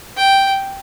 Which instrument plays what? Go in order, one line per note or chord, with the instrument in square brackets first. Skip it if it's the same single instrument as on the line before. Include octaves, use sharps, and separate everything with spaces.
[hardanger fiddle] G5